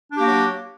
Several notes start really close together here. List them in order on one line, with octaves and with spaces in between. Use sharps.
D4 G4 A#3 F#4 F#3